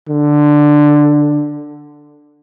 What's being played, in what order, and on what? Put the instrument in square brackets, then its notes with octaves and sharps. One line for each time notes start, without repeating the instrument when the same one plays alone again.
[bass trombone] D3